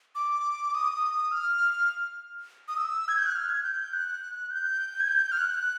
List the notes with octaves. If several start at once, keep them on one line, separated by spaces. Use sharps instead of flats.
D6
D#6
F6
D#6
E6
G#6
G6
F#6
F6
G#6
G6
F#6
G6
G#6
G6
F6
F#6